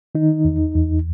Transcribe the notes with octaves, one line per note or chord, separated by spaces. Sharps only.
D#3 D#4
E2
E2